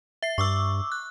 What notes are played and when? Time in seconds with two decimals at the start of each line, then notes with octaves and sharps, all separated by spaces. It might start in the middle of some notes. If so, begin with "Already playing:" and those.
0.22 E5 C7
0.38 G2 C#6 D6 E6
0.92 F#6